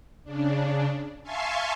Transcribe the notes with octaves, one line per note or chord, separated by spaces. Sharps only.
C#3 D4
E5 F5 G#5 A5 C6 C#6